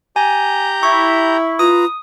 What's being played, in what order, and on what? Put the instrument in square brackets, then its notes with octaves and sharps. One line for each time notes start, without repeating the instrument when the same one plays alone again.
[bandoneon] G4 A#5 G6 [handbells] G#5
[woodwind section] E4 [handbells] C#6
[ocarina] F4 [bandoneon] B4 A#5 [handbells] D#6